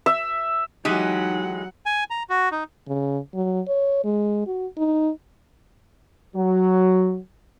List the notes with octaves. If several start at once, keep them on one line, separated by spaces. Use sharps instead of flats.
E5
E3 F#3 G#3 D#4 G4 F#5
G#5
A#5
F#4
D#4
C#3
F#3
C#5
G#3
F#4
D#4
F#3